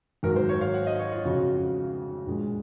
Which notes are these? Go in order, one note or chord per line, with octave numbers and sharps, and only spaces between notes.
G#1 G#2 F#3 A#4
C5
C#5
F5
F#5
D#5
C#5
F4
F1 F2 C#3 F#4
A#1 A#2 G#3